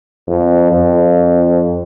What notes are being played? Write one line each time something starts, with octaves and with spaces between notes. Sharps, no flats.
F2
F2